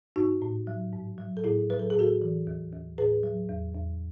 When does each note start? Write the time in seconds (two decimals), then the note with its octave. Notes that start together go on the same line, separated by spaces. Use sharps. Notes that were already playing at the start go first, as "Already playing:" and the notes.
0.16 G#2 D#4 F#4
0.42 A2
0.67 F#3
0.93 G#2
1.18 F#3
1.37 A4
1.44 A2 E4 G#4
1.70 F#3 B4
1.79 A4
1.90 G#4
1.95 A2 F#4 A4
2.22 E3
2.47 D#2
2.73 D#2
2.98 A2 G#4 B4
3.23 F#3
3.49 E2
3.75 E2